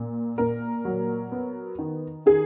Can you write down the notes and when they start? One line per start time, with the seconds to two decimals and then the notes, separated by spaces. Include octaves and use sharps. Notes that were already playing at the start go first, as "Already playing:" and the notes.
Already playing: A#2 A#3
0.38 A#2 A#4
0.85 F#3
1.32 B3
1.79 D#3
2.26 D#3 G#4